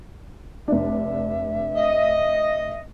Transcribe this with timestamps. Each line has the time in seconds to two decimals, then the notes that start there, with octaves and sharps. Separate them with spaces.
0.68 F1 D4 E5
1.76 D#5